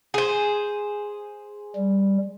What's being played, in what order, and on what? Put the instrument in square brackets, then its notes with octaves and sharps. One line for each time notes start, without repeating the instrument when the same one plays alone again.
[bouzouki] G#4 C5
[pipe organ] G3